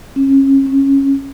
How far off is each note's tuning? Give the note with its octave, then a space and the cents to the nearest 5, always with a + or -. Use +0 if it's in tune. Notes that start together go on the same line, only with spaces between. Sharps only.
C#4 -30
C#4 -15